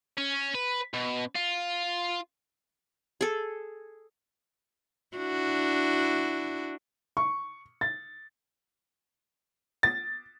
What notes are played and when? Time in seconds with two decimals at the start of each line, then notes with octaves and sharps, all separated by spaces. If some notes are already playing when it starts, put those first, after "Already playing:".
0.17 C#4
0.55 B4
0.94 B2
1.36 F4
3.21 G#4 A4
5.17 D4 E4 F#4
7.17 C#6
7.81 A6
9.83 A6